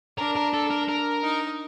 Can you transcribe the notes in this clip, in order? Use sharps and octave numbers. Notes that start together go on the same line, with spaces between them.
D4 A#4
A#4
A4
A#4
A#4
D#4